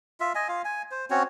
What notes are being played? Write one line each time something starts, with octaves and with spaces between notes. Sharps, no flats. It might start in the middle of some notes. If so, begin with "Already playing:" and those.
F4 E5
D#5 G#5
F4 F5
G#5
C5
C4 C#4 F#4 C#5